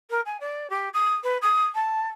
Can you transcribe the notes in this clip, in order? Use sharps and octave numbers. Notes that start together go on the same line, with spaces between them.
A#4
G#5
D5
G4
D#6
B4
D#6
A5